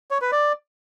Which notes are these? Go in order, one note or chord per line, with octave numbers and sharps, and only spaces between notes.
C#5
B4
D5